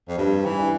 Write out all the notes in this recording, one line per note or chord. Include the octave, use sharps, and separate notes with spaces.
F2
G2 G3
E3
D4